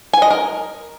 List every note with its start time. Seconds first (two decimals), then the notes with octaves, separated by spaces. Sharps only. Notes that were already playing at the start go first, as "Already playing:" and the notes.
0.13 G#5
0.22 D#5
0.30 A#4